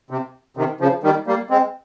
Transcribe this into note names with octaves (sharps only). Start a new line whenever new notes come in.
C3
C3 D#3
C#3 F3
D#3 G3
G3 A#3
G#3 C4